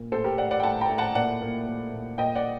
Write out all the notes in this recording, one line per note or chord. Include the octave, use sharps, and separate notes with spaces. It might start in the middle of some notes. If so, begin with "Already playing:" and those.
Already playing: A#2
A2 A4 C5
G4 A#4
A2 D5 F#5
D5 F#5
G5
A2 F#5 A5
G5 A#5
A2
F#5 A5
A#2 D5 F#5
A#2
A#2
A#2
A#2 D#5 G5
D5 F#5